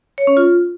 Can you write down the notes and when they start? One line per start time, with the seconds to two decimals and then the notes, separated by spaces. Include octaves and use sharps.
0.18 C#5
0.27 C#4
0.37 F4